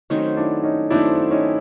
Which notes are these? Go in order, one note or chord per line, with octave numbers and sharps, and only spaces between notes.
D#3 F#3 A3 C4 C#4 D#4
D4 E4
C#4 D#4
D#3 F#3 A3 C4 D4 E4
C#4 D#4